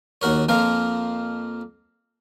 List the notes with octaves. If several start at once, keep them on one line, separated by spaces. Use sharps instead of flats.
D#2 F#4 A#4 C#5
F2 F3 A#3 A#4 F5